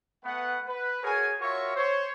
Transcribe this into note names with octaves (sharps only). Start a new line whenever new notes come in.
A3 B3 B4 F#5
B4
F#4 G#4 A#4 C#5 G#5
F4 F#4 A#4 C#5 E5 C#6
C5 C#5